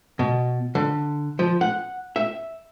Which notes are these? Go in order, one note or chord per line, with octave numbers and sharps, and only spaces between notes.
B2
D3
F3
F#5
E5